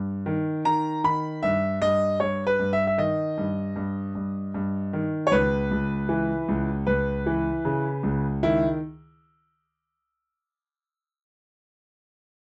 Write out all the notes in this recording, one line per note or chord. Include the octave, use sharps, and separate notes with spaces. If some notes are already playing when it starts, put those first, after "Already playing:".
Already playing: G2
D#3
D#3 A#5
D#3 B5
G2 E5
G2 D#5
G2 C#5
B4
G2
E5
E5
D#3 D#5
G2
G2
G2
G2
D#3
C#5
C#2 B4
C#2
E3
C#2
C#2 B4
E3
C#3
C#2
D#3 E4